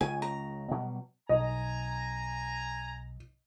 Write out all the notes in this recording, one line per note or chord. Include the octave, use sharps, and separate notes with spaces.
C#2 C#3 G#5
A#5
B2 F#3 G3
B1 D#5 G#5 A#5